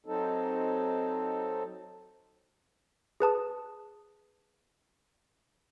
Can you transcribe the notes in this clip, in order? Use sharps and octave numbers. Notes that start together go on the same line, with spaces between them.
F#3 C4 D#4 A4
G#4 B4 A5 D#6